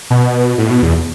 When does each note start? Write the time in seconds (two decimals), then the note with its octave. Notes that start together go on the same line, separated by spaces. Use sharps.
0.10 B2
0.58 A2
0.70 B2
0.83 E2